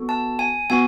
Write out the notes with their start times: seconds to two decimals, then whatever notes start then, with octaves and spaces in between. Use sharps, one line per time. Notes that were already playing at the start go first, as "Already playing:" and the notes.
Already playing: B3 F#4 A4
0.09 A5
0.39 G#5
0.70 B3 F#4 G#5